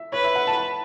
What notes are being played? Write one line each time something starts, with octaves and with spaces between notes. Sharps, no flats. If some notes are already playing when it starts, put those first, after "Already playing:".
Already playing: E5
B4 C#5
E5
F#5
A5
A5